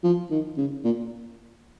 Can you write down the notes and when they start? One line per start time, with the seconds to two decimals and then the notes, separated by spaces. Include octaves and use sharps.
0.04 F3
0.31 D#3
0.58 C#3
0.84 A#2